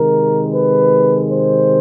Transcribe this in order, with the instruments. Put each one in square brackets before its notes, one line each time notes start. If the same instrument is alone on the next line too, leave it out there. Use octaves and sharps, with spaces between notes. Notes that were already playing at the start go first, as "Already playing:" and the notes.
Already playing: [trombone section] C3 D#3 G#3 A#4
B4
C5